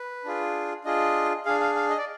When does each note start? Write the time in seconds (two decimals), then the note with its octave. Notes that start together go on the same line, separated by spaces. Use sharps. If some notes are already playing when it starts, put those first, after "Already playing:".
Already playing: B4
0.24 D4 F4 G#4
0.84 D4 F4 G#4 D#5
1.45 D4 G#4 F5
1.60 F5
1.75 F5
1.90 D#5
1.98 D5